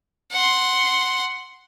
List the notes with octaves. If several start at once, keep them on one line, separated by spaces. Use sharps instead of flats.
F#5 C6